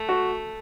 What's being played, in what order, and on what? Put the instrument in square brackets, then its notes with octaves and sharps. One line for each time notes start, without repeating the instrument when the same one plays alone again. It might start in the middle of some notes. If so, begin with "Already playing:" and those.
Already playing: [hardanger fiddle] A3
[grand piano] F#4